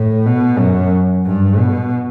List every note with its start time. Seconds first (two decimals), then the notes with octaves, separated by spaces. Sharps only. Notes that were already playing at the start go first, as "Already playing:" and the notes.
Already playing: A2
0.26 B2
0.58 F#2
1.25 G2
1.58 B2